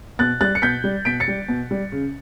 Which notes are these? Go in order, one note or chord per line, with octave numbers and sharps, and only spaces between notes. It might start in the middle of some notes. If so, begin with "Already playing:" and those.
B2 F#6 A6
G3 F#6 A6
C#7
B2 G6 B6
G3
B2 B6 D7
A6 C#7
G3
B2
G3
C#3